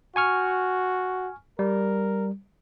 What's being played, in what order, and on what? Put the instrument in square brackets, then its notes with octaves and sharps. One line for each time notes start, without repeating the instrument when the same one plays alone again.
[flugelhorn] F#4 [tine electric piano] G#5 C#6 F6
[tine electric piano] G3 [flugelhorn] A#4